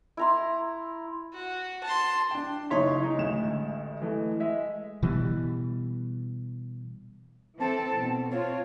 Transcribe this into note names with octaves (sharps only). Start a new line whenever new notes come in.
E4 A#5 C6
F#4
A5 C6
D4 G5
F#1 D#4 E4 C#5 C6 B6
G#3 D#4
A1 D2 G#3 E7
E3 G#3 A3
G#3 E5
B2 E3 G3
E3 C4 A4 A5
B2
C4 F4 C#5